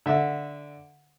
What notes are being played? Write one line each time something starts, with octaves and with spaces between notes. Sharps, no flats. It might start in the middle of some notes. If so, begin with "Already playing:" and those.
D3 E5